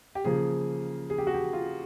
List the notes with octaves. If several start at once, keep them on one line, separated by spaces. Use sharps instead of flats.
G4
C#3 F3 A#3 G#4
G#4
G4
F#4
G4
F4